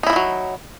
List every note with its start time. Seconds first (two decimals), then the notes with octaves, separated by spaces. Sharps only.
0.03 D#4
0.07 E4
0.10 F3
0.13 D#3
0.16 F#3